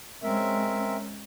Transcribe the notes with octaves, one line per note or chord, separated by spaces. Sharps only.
G#3 C4 C#4 A#4 E5